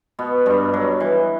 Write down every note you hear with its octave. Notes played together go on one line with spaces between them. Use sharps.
B2 B3
G2 G3
F#3
E3